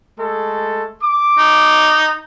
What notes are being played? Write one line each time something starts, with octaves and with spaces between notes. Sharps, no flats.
G#3 A3 A4
D6
D#4